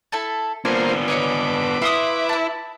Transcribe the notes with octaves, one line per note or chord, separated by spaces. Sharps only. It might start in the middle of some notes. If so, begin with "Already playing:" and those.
E4 A4 A5
A#3 B3 D4 F4 C5 G#5
B4 C#5 D#5 G#5 D6
E4 F5 C6 D#6
A5 B5